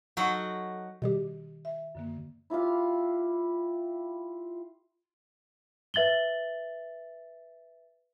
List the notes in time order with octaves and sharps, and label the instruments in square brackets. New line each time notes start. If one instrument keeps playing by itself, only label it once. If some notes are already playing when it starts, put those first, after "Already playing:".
[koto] F#3 D#4 F#4 A4 F#5
[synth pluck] B2 G3 G4 [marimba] D#3
[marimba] E5
F#2 D3 A#3
[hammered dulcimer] E4 F4 G4 F5
[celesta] B4 E5 A6 F#7 G7